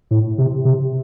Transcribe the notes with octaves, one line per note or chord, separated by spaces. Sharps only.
A2
C3
C3